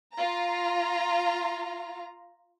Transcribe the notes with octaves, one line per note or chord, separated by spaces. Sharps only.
F4 A#5